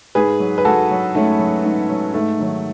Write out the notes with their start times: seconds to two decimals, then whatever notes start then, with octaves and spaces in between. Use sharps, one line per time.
0.15 G#2 G#4 B4
0.40 F#3
0.58 B4
0.65 G#2 F#4 A4
0.91 F#3
1.15 G#2 A3 C#4
1.39 F#3
1.64 G#2
1.89 F#3
2.14 G#2 A3
2.39 D#3 F#3